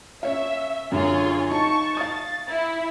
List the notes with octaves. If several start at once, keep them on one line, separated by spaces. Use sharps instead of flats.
C#4 C#5 E5 F5
F#2 D3 F4 G#4 C#5
D#4 A5 C#6
F5 D#6 A6
E4